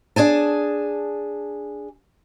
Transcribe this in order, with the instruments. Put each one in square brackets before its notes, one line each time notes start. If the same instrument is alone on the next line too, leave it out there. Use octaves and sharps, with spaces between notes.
[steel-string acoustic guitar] D4 G#4 G#5 A5